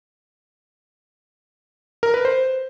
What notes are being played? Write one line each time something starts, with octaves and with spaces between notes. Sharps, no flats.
A#4
B4
C5